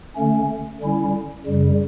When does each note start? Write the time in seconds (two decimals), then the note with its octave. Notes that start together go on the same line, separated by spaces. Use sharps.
0.15 D3 A3 C#4
0.81 D3 G3 C#4 E4
1.46 F#2 C#3 G3